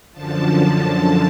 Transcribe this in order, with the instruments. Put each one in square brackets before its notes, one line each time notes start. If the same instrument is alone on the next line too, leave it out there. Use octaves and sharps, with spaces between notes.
[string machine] F#2 D3 F3 A5